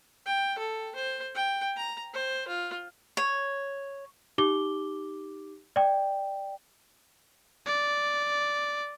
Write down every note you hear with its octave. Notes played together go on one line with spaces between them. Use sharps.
G5
A4
C5
G5
A#5
C5
F4
C#5
D#4 G4 D6 G7
D5 G5
D5